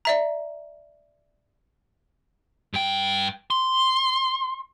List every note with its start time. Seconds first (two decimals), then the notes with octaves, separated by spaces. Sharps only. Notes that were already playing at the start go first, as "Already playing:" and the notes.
0.05 D5 E5 A#5
2.73 G2 G5
3.50 C6